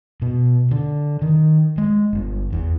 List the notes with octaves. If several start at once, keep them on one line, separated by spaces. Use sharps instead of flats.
B2
D3
D#3
G#3
G1
E2